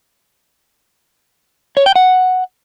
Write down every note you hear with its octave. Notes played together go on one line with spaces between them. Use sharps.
C#5
G5
F#5